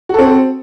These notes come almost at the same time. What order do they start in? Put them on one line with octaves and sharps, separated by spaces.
F#4 A4 C4